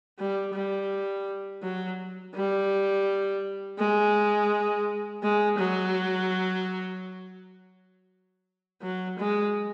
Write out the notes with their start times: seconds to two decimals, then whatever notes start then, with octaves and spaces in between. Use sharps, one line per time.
0.19 G3
0.54 G3
1.63 F#3
2.34 G3
3.79 G#3
5.23 G#3
5.58 F#3
8.82 F#3
9.19 G#3